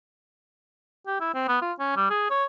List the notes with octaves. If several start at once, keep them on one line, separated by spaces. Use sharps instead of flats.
G4
E4
C4
B3
F4
C#4
G3
G#4
C#5